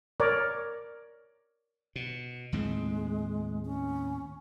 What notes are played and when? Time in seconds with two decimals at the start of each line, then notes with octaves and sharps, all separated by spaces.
0.20 A#4 C#5 D5
1.96 B2
2.52 D#2 A2 G#3 C4
3.65 C#4